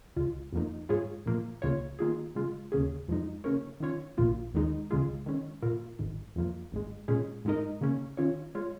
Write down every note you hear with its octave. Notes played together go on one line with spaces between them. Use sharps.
C#2 C#3 G#3 F4
F2 F3 A#3 D#4
G#2 G#3 F4 G#4 C#5
A#2 F3 A#3
C#2 C#3 A#3 F4 C#5
D#3 A#3 F4 G#4
C#3 G#3 F4
D#2 C#3 A#3 C#4 G#4
F2 F3 G#3 D#4
C#3 A#3 C#4 A#4 C#5
D#3 C#4 F4 C#5
A#1 A#2 A#3 F4
D#2 D#3 G#3 D#4
C#2 C#3 G#3 F4 G#4
D#3 G#3 C#4
A#2 A#3 F4 A#4
G#1 G#2 D#3
F2 F3 A#3
G#1 G#2 G#3
A#2 G#3 C#4 G#4
G#2 G#3 D#4 A#4 D#5
C#3 A#3 C#4
D#3 C#4 F4 C#5
G#3 F4 C#5